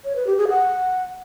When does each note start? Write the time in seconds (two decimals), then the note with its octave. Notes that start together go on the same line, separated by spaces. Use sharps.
0.05 C#5
0.16 B4
0.27 G4
0.38 G#4
0.49 F#5